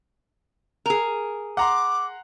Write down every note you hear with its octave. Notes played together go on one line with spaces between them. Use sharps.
G#4 A#4
F#5 A#5 C6 D6